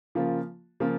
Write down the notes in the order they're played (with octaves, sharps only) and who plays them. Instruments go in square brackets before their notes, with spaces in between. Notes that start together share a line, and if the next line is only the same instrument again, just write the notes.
[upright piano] C#3 F3 A#3 F4
C#3 F3 A#3 F4